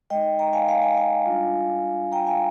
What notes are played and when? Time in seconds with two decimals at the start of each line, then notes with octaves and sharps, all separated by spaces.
0.10 G#3 D#4 D#5 G5
0.39 G5 A#5
0.53 F5 G#5
0.68 F5 G#5
0.82 F5 G#5
0.97 F5 G#5
1.25 G3 D4 F4
2.12 G5 A#5
2.27 F5 G#5